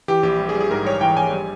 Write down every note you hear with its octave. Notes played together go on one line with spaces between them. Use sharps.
E3 G4
A#1 G4
G3
G#4
G3
G#4
G#2 A#4
G3 C#5
E3 G5
A#1 G#5
G3